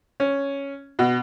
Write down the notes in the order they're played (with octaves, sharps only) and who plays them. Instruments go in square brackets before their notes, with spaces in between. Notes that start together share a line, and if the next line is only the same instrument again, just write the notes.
[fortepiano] C#4
B2